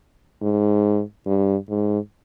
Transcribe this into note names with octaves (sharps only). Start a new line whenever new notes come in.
G#2
G2
G#2